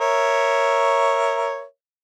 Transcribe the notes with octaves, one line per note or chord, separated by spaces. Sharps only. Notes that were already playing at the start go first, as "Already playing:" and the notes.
A#4 C#5 E5